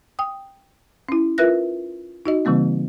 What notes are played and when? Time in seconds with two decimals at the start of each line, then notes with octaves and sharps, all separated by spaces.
0.19 G5 D#6
1.09 C#4 E4
1.38 F4 A#4 B4 E5 F#6 A#6
2.26 D#4 F#4 D#5
2.45 C#3 E3 G3 A#3 C4